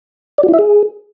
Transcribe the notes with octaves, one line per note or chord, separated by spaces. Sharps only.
D5
F#4
E4
E5
G#4